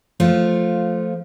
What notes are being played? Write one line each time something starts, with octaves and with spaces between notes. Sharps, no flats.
F3 A3 F4